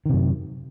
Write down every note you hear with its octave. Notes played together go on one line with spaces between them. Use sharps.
F#2 C3 D#3